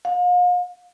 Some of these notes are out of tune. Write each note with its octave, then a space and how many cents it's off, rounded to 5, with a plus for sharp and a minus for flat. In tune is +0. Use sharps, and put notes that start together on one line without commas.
F5 +40